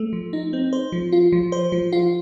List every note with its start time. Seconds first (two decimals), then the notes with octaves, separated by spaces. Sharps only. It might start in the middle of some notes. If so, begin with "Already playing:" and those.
Already playing: A3
0.13 F3
0.33 D#4
0.53 C4
0.73 C5
0.92 F3
1.12 F4
1.32 F3
1.52 C5
1.72 F3
1.92 F4